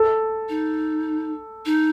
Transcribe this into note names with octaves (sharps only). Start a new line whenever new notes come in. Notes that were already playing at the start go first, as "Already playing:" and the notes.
Already playing: A4
D#4
D#4